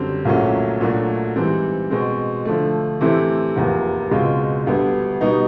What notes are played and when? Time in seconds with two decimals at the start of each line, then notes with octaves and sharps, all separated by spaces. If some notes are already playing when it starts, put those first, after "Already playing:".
Already playing: F#2 D3 G3 C4
0.25 C2 A#2 F#3 A3 C#4
0.81 A#2 F#3 A3 D4 F#4
1.36 G#2 E3 G3 C4
1.91 B2 G#3 C4
2.45 D3 F3 A3
3.01 C3 E3 A3 C4 E4
3.56 F1 E2 C3 F3 A#3
4.11 C#2 B2 G#3 C4 F4
4.66 D2 D3 G3 B3
5.21 B2 G3 B3 D#4